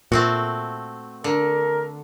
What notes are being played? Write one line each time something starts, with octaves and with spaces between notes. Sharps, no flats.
A#2 A3 C4 F#4
D3 A#4